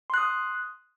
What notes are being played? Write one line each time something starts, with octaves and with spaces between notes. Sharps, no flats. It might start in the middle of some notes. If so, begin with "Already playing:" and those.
C6 D#6 F#6